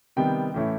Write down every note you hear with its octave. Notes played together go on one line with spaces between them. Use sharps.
C3 D#3 G3 B3 G5
A2 E3 A3 C#4 E4